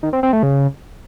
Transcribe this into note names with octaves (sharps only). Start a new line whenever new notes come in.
D#3
C4
C4
A3
C#3